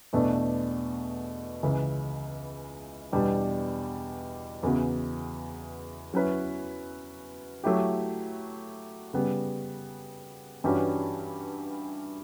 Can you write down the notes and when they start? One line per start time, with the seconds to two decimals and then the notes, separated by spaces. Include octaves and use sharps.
0.13 E2 B2 A3 D4
1.63 C#2 C#3 E3
3.13 E2 B2 G3 D4
4.63 E2 C#3 E3 B3 F#4
6.14 F#3 C#4 E4 B4
7.64 F#3 A3 E4 G4
9.14 C#3 G3 B3
10.64 G2 E3 G3 C#4 F#4